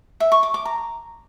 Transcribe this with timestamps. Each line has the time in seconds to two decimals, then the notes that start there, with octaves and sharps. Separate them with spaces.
0.20 E5
0.32 C#6
0.43 D6
0.54 D6
0.65 A#5